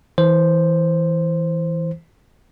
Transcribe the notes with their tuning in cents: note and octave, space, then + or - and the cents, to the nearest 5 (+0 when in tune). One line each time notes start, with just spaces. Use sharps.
E3 -15 C5 +0